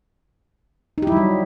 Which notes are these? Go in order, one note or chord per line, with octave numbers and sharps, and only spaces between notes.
F#3 G3 D#4 E4 G4